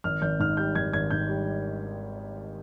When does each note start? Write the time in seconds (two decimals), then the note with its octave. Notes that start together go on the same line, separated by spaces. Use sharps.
0.04 G#1 F6
0.22 G#1 G6
0.39 G#2 F6
0.57 G3 G6
0.75 G#1 G#6
0.93 G#1 G#6
1.11 G#2 G6
1.29 G3